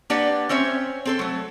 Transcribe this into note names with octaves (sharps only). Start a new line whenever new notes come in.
A#3 D4 G4 B4 D5 F#5
C4 C#4 C5 C#5 E5
C4 A4 C5
F#3 A3